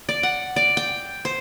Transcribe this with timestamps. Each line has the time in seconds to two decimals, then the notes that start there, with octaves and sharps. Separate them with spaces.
0.09 D5
0.23 F#5
0.56 D5
0.77 G5
1.25 C5